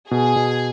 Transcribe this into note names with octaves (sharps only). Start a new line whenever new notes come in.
B2 G#4
B2